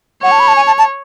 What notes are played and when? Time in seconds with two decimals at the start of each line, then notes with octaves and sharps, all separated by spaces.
0.23 C#5 F#5
0.31 A5
0.40 B5
0.48 A5
0.56 G#5
0.67 A5
0.78 A5